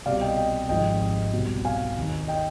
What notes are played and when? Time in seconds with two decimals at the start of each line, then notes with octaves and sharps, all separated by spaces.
0.06 C2 B2 D5 F5
0.21 D#5 G5
0.37 D#5 G5
0.69 G#1 G#2 F3 D#5 G5
1.33 C2 B2
1.65 F5 G#5
1.97 D#2 D#3
2.28 D#5 G5